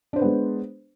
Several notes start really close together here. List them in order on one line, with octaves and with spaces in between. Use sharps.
D4 C5 B4 B3 G#3